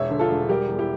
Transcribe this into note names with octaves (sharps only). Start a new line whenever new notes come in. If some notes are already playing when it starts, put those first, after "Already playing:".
Already playing: E1 C#5 E5
D3
F4 A4
E1
G3 G4 A#4
E2
E4 G4